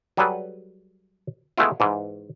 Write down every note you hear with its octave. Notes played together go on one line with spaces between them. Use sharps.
F#3 G3 G#4 A4 B4
G#3 A3 B3 E4 F4
G#2 E3